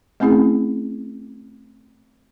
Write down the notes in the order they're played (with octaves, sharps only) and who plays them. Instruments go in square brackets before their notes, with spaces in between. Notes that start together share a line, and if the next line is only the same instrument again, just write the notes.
[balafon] A3 C4 C#4 E4 G#4